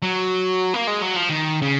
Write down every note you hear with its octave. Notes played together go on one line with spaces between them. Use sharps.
F#3
A#3
G#3
F#3
F3
D#3
C#3